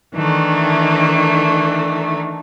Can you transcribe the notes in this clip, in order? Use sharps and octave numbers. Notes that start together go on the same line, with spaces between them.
D#3 E3 A3 D4